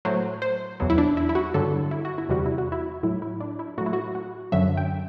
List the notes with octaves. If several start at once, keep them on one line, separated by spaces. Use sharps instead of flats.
A2 F#3 C5
C5
E2 B2 F#3
E4
D4
E4
E4
F#4
G2 D3 F#3 A4
E4
F#4
E4
E2 C3 G3 F#4
E4
F#4
E4
A2 F#3 E4
E4
D4
E4
A2 F#3 F#4
E4
F#4
F#4
F#2 D3 F#3 E5
G5